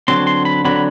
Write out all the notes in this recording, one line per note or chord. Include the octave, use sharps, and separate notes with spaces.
D3 F#3 C4 C6
C6
B5
D3 F#3 C4 B5